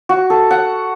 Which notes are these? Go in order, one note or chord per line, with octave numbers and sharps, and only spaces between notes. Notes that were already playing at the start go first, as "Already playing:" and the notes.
F#4
A4
F#5